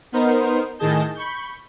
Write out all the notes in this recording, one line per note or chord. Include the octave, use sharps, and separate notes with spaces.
B3 D#4 A#4 C5
A2 D#3 G#4 D#5 A5 G6
B5 C#6 G6